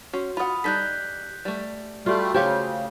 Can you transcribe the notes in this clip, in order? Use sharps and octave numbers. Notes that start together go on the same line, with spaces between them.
C#4 F#4
F4 F#5 B5 D#6
G3 D#4 A4 F#6 G6 B6
G3 A3
G3 A3 F4 F#4 D5
C#3 A3 F4 G4 C5 C#5 F5